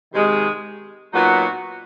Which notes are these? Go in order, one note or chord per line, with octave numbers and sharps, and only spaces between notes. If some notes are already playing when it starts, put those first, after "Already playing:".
C3 D#3 G#3
A#2 F#3 B3 D#4 F#4